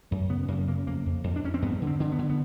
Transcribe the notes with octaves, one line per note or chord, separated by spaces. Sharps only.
F#2 A3
C#3 B3
B3
F#2 A#3
C#3 A#3
F2 A#3
F2
F2
D4
F2 C#4
C4
G2 B3
D3
C4
D3
B3
D3
B3